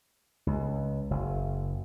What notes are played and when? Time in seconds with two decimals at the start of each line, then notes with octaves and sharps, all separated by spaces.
0.47 C#2
1.11 F#1